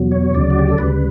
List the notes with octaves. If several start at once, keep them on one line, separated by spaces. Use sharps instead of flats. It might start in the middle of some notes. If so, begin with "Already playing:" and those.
Already playing: E2 B2 F#3
C#5
D2 C#3 F#3 D5
F#4
G4
A4
D2 C#3 G3 B4